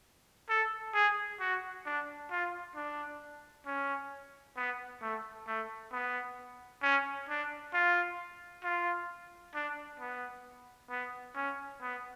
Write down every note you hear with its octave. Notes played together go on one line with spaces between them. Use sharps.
A4
G#4
F#4
D4
F4
D4
C#4
B3
A3
A3
B3
C#4
D4
F4
F4
D4
B3
B3
C#4
B3